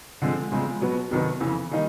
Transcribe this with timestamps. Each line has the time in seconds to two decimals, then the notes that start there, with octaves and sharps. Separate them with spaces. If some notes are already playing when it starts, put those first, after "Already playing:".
0.22 D3 F3 G#3 C4
0.51 E2 C#3 F3 G#3 C4
0.81 B2 F#3 B3
1.11 C2 C3 D#3 F#3 B3
1.41 F2 C#3 E3
1.71 D#3 G3 A#3 D#4